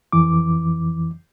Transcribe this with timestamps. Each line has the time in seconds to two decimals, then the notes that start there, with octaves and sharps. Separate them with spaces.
0.12 F2 E3 D6